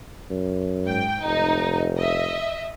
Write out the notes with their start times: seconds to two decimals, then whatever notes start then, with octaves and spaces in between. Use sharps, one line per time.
0.31 F#2
0.86 G#2 G5
1.25 F1 D#4
1.98 D#5 E5